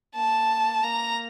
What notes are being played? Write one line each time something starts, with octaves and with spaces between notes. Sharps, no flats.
A#3 A5
A#3 A#5